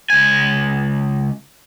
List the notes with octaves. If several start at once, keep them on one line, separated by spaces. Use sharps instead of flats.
C#2 G#5